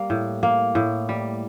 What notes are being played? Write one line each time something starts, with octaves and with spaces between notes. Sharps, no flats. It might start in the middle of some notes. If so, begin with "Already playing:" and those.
Already playing: G3 A#3
A2
A#3
A2
G3